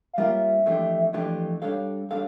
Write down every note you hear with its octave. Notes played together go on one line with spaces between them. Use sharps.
F5
G3 A#3 C#4 F4 A#4 E5
F2 E3 A3 D4 G4
F2 E3 A3 D4 G4
G3 D4 A4 C#5 F5
G3 D4 A4 C#5 F5